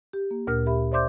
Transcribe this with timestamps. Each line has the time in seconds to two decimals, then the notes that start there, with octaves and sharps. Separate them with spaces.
0.13 G4
0.31 A#3
0.47 D2 A#2 A#4 F6
0.66 G4 E5 B5
0.92 C5 D5 E5 C6 D6 G6